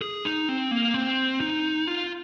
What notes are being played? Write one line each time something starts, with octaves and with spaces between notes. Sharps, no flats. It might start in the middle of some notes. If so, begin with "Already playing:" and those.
G#4
D#4
C4
A#3
C4
D#4
F4